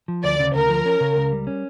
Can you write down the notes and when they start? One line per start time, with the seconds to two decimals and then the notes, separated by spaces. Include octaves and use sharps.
0.08 F3
0.23 D2 D5
0.40 C#3
0.54 D2 A#4
0.70 F3
0.86 C#4
1.01 C#3
1.16 C#2
1.32 G3
1.47 C#4